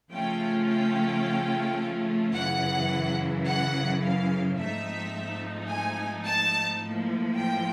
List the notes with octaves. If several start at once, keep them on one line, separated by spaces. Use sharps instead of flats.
C#3 F3 A3 C#4 F4 G5
G5
F#2 C#3 E3 F#5
F#5
F5
G#2 F3 A3 C4 D#4 E5
G#5
A5
A2 F3 A#3
G5